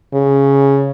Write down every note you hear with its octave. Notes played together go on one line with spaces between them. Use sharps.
C#3